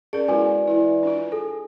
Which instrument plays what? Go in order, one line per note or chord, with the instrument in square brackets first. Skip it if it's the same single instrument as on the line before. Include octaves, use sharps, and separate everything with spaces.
[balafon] C#4 A#4 [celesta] G#4 [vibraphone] D5
[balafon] G#3 E4 F#4 [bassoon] B3 [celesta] G#5
[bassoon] E3 [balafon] E4
[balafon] D4 F4
[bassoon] G#4 [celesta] A4